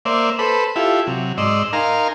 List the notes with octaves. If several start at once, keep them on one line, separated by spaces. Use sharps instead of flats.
A#3 C5 D5 E5
A4 B4 C5 B5
E4 F4 G4 A4 E5
C3 F#3
G#2 D5 D#5 C6 E6
D#4 A#4 F5 G#5 A#5 C6